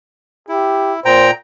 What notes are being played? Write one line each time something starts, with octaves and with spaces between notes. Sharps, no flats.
E4 G4
A#2 C5 G5 A#5